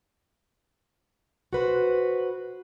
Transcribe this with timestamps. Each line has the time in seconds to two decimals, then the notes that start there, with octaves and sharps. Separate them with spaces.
1.53 F#4 B4 C5